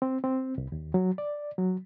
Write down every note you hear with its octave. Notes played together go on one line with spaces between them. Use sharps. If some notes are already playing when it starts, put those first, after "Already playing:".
C4
C4
C2
D#2
F#3
D5
F#3